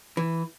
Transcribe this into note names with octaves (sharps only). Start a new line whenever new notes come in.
E3